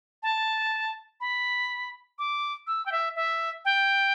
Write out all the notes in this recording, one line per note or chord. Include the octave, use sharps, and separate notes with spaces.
A5
B5
D6
E6
G5
E5
E5
G5